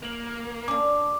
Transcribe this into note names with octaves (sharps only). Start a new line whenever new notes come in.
A#3 F7 F#7
C#4 D4 D6